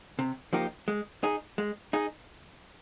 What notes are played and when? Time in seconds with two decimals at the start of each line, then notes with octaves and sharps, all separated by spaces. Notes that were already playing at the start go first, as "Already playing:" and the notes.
0.19 C3
0.53 F3 A#3 D#4 G4
0.88 G#3
1.23 D#4 G#4
1.58 G#3
1.93 D#4 G#4